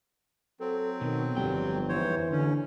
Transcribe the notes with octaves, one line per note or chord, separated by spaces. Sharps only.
F#3 C4 A4
B2 D#3
G1 F2 G3 G5
G#2 E3 C5 C#5
D#2 D3 C#4